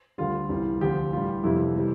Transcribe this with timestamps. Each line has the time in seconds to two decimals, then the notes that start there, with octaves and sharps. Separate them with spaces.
0.18 D2 D3 G3 F4
0.49 C2 C3 E3 G3
0.81 D2 D3 F3 G4
1.13 A2 E3 G3 F4
1.44 F2 C3 E3 G3 E4
1.76 C3 E3 G3